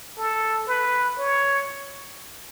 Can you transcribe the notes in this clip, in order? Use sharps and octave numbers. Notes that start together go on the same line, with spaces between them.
A4
B4
C#5